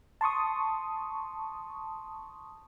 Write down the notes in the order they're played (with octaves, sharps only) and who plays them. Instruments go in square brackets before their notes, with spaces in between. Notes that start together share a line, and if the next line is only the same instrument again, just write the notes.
[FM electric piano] A5 C6 C#6 D#6